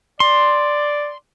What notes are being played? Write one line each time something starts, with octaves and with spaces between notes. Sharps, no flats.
D5 C6